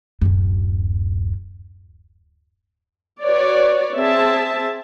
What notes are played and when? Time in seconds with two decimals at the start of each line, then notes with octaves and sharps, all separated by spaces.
0.21 D1 F#2
3.23 F#4 B4 C#5 D5
3.95 C4 G#4 E5 A5